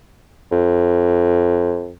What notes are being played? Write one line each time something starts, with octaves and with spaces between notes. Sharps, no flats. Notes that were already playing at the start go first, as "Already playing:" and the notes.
F2